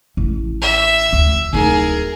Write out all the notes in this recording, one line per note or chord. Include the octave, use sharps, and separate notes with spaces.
A1
E5
D2
D1 D#4 G#4 A#4